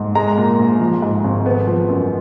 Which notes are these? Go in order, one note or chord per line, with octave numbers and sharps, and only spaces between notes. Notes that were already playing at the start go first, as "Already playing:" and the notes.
Already playing: G#2
G#3 A#5
A#2
A#1
F3
G#2
G#1
B3
F3
F#2